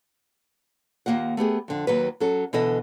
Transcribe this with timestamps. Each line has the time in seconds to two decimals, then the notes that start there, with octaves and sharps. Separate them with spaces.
1.06 D#2 C#3 A#3 F4 F#5
1.37 A3 B3 G4 G#4
1.68 F2 D3
1.87 D#2 F#3 B4
2.20 F#3 C#4 A4
2.53 B2 D3 E3 A4 D#5